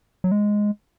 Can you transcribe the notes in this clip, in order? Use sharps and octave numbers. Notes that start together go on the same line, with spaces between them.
F#3
G#3